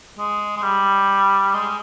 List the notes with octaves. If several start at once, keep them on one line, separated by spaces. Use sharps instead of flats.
G#3
G#3
G3
G#3